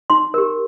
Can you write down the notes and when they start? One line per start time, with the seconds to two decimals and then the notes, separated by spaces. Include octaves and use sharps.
0.10 D#4 C6
0.34 G4 A#4